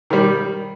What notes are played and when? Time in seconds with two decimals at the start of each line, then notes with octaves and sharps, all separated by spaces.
0.10 D#3 G3